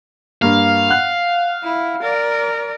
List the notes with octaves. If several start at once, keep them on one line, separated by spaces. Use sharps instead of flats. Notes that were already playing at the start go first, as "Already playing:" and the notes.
G2 A#3 F5
F#5 F#6
E4
A#4 D5